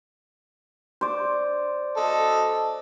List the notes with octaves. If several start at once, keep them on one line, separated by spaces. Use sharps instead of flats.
C5 D5
A4 D#5